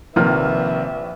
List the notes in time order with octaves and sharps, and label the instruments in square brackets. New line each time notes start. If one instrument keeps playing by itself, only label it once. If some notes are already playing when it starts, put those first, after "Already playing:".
[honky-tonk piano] A#1 F6 [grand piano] C3 D#3 [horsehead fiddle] B4 E5